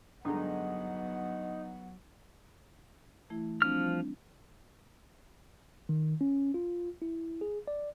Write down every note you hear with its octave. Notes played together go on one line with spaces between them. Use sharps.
G2 D3 F#3 G#3 B3 D#4 F#5
E3 A3 E4
F3 G3 C4 D4 F6
D#3
C#4
F4
E4
G#4
D5